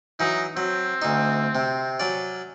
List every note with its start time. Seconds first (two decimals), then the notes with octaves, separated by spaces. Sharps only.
0.20 E3 F#3 D#4
0.57 F#3 C4
1.02 D2 D#4
1.55 C3
2.00 F#3 C#4 D5